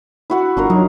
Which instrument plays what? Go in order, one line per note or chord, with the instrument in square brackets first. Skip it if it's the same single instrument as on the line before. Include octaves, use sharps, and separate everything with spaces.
[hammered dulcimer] E4 F#4 F#5
[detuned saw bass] G1 [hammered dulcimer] D4 F4 A#4
[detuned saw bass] F#3 [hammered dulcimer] D#4